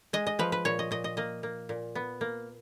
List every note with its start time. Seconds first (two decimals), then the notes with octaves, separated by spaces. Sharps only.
0.13 G#3 D#5
0.27 D#5
0.39 F3 B4
0.52 B4
0.65 A#2 C#5
0.79 D#5
0.91 A#2 D#5
1.04 D#5
1.17 A#3 D#5
1.43 A#3
1.69 A#2
1.95 B3
2.21 A#3